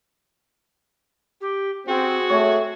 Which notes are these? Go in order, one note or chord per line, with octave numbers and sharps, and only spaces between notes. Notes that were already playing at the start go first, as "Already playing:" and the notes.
G4
C4 F#4 G#4
A3 C#5